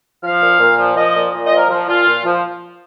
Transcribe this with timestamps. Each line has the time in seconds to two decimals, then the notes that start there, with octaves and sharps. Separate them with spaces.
0.23 F3 F5
0.41 A#2
0.60 A#2
0.77 F3
0.95 F3 D#5
1.15 A#2
1.33 A#2
1.45 D#5
1.51 F3
1.57 A#4
1.69 F3
1.88 A#2 F4
2.06 A#2
2.25 F3